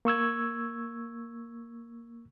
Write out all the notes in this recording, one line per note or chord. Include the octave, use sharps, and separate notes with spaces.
A#3 C#6 E6 G#6